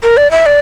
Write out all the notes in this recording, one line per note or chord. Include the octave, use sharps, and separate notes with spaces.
A#4
D5
E5
D5